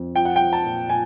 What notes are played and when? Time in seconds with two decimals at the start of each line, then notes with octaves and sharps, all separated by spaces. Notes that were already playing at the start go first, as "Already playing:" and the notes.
Already playing: F2
0.16 F3 G5
0.25 F#5
0.36 F3 G5
0.53 A5
0.65 A#2
0.90 A#2 G#5